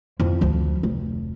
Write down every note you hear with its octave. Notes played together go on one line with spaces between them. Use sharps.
F2 E4
D2 F3
F1